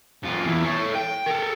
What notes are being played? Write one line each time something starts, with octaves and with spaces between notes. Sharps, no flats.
F#2 F4
E2 E4
A4 C#5
G5
A4 A#4